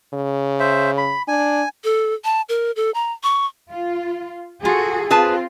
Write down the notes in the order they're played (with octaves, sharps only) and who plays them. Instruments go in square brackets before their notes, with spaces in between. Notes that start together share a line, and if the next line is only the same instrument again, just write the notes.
[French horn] C#3
[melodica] C5 E5
B5
[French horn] D4 [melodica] G#5
[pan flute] A4
A5
A#4
A4
A#5
C#6
[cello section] F4
[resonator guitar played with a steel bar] F4 [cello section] F#4 G#4 A4
[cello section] C4 F4 [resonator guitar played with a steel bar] G#4 B4 A5